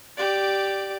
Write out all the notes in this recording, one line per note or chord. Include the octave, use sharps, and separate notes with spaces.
G4 D5